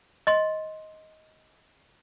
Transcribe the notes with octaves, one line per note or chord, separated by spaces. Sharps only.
D#5 C6